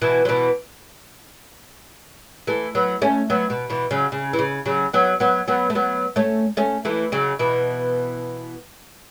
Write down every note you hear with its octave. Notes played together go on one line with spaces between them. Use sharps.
B2 E3
F#3
B2 E3
E3 A3
F#3 B3
A3 C#4
F#3 B3
B2
B2 E3
C#3 F#3
C#3
E3
C#3
C#3 F#3
F#3 B3
F#3 B3
F#3 B3
A3
F#3 B3
A3 C#4
A3 C#4
E3 A3
C#3 F#3
B2 E3